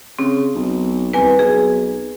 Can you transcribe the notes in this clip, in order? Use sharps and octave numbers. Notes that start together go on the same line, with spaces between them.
C#3 C4
B1
C2 B4 G#5
B1 G#4